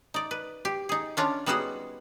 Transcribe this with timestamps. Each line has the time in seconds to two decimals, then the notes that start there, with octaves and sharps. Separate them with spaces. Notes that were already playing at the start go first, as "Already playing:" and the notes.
0.14 D#4 D5
0.31 B4
0.65 G4
0.89 D#4 G#4
1.17 C#4 D4 F4 C#5
1.46 G3 B3 D#4 F#4 G#4 F#5